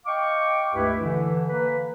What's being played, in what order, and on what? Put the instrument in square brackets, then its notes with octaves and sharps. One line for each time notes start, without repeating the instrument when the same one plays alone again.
[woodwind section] D#5 F5 G5 C#6 D6
C#2 G2 A3 E4 G4 B4
D3 E3
A#3 B4